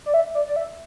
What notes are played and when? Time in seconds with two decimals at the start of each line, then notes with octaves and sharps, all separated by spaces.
0.06 D5
0.14 E5
0.35 D5
0.48 D5
0.56 E5